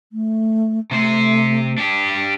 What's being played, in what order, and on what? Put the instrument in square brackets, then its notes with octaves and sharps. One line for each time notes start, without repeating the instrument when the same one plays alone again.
[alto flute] A3
[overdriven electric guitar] C3 C5 [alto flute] A3
[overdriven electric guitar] D4 G4